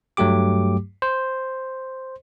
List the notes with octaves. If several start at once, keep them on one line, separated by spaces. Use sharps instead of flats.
G2 F#3 A3 G4 D6
C5